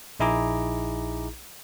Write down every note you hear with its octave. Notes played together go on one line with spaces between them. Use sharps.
A#1 D#4 E4 G#4 A#5 D6